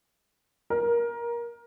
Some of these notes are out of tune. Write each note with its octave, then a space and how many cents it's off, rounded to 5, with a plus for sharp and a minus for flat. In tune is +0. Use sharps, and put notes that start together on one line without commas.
A#4 +20